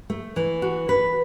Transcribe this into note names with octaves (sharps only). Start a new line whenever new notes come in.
A3
E3
F#4
B4